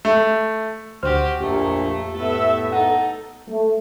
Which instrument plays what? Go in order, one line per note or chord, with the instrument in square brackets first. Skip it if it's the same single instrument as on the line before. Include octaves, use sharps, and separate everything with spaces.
[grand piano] A3
[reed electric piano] D2 C5 F6 [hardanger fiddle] F#4 G4
[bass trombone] A#1 [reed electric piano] F2 G4 [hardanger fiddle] A3
[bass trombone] A2 [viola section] B3 E5 [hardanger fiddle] A4 B4
[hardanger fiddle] D#4 [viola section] A4 [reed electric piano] F#5
[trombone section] A3